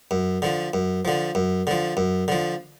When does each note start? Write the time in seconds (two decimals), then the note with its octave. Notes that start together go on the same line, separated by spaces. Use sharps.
0.11 F#2
0.42 D3 F3
0.74 F#2
1.05 D3 F3
1.35 F#2
1.67 D3 F3
1.97 F#2
2.28 D3 F3